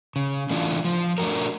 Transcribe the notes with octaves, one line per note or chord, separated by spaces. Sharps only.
C#3
E3 A3 D4 F4
F3
A3 D4 F#4 A#4